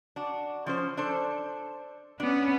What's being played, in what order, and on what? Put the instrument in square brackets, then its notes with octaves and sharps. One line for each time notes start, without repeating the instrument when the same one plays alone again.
[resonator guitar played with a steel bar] D4 F#4
F3 C#4 C5
D4 A4 C5
[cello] B3 C#4 [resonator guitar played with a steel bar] D4 F#4